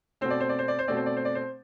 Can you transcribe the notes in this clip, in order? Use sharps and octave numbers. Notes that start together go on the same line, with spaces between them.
B2 A3 C4 C5
D5
C5
D5
C5
D5
C5
B2 A3 C4 D5
C5
D5
C5
D5
C5